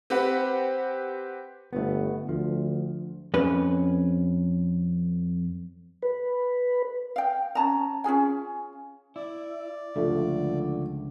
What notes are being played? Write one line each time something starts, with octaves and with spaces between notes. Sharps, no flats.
C4 G4 B4 F#5
G1 A3 B3
D2 F3
F2 C#4 B4
B4
F5 G5
C#4 A5 A#5
C#4 F4 G#4 G#5
E4 D5
C#2 D3 F3 A3